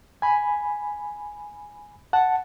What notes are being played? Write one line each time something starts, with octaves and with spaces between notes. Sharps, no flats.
G#5 B5
F#5 A5